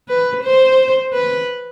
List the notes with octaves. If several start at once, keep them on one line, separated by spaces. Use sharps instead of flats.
B4
C5
B4